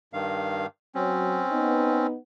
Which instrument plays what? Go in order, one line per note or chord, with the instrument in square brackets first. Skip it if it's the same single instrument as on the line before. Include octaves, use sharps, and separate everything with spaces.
[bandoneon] G2 D#3 F5
[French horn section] F#3 [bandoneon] C4 C#4
[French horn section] B3 D#4